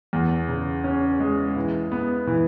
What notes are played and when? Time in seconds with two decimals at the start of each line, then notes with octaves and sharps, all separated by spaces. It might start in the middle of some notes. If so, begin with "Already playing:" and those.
0.13 E2
0.48 C#3
0.84 C#4
1.20 G#3
1.56 E3
1.92 B3
2.27 E3